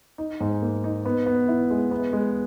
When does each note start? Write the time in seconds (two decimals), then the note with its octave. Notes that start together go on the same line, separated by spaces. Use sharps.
0.18 D#4
0.40 G#2
0.62 A#3
0.84 D#4
1.05 B3
1.26 B3
1.48 E4
1.70 G#3
1.91 B3
2.13 G#3